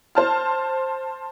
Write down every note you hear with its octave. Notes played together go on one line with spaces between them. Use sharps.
C5 A5 F6